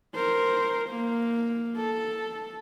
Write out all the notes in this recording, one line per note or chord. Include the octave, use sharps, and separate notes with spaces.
A#4 C5
A#3
A4